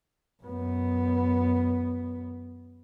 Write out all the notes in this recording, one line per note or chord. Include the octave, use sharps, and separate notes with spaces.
F#2 B3